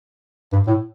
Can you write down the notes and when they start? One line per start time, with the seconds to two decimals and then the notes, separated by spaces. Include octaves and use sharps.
0.52 G2
0.67 A2